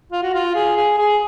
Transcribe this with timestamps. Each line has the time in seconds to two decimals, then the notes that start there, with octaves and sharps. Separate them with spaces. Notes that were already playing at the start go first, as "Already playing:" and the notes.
0.12 F4
0.23 F#4
0.34 F4
0.55 G#4
0.76 G#4
0.98 G#4